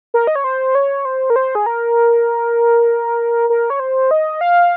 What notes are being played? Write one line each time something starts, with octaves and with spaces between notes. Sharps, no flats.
A#4
D#5
C#5
C5
C#5
C5
A#4
C5
G#4
A#4
A#4
C#5
C5
D#5
F5